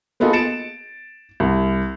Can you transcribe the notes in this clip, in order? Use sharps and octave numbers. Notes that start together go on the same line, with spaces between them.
A#3 B3 D#4 F4 G#4 A4
A6 C#7 D7 E7
C2